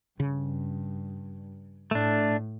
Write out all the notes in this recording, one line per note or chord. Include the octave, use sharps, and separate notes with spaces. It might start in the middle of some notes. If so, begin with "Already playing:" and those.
G2 C#3
A2 A3 D4